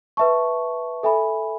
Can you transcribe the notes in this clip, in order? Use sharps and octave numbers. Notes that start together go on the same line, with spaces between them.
B4 E5 A5 C#6
A4 E5 G#5 B5